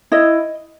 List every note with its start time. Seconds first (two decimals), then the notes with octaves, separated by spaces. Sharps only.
0.12 E4 D#5